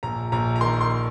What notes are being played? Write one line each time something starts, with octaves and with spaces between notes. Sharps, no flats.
A#1 A#5
A#1 A#5
A#5
D#3 C6
C6